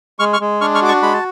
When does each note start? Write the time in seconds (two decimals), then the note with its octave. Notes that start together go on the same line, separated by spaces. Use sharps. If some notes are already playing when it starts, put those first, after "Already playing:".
0.19 G#3 C#6 F6
0.33 C#6 F6
0.40 G#3
0.61 D4 C#6 F6
0.75 C#6 F6
0.82 F#4 D6
0.88 A5 C#6
1.02 G#3 B5
1.13 A5